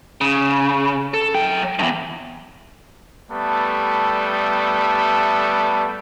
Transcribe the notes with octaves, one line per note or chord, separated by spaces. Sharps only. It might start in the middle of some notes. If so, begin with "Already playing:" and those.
C#3
A4
F#3 G5
E2 G2
G3 A3 B3 A4